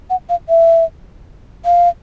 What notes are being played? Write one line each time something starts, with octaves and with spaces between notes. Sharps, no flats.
F#5
F5
E5
F5